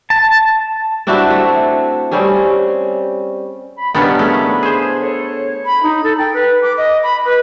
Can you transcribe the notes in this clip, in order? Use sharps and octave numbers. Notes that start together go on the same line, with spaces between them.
A5
C4 D4 E4 F#4
A3
G3 C4 C#4 G#4
B5
D#3 G3 B3 C#4 D4 F5 F#5
C#3 A3 E4 B5
G#4 C5
A4 C#5
B5
D#4
A4
G5
B4
D6
D#5
B5
B4